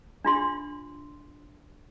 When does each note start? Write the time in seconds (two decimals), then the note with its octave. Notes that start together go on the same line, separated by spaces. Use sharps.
0.24 D4 F4 C6